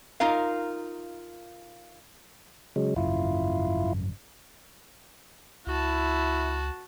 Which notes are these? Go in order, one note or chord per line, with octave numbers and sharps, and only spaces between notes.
D#4 F4 A#4 F5
C#3 F#3 G#3
G#1 F#2 C#3 E4 F4
C#2 E4 F#4 A5